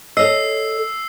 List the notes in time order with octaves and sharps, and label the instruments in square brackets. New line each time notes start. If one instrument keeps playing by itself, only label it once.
[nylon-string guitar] A4 C#5 D#5 [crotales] E6 C7